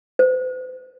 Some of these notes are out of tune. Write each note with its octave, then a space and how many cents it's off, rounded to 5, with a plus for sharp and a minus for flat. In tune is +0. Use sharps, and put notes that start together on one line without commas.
C5 -45